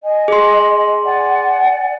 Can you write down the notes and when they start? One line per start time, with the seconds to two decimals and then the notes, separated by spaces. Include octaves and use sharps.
0.03 D#5 G#5
0.28 G#4 C6
1.04 D5 F#5 G#5